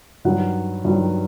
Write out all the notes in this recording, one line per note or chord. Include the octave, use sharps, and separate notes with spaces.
G2 D#3 F#3 F#5
G2 D#3 F#3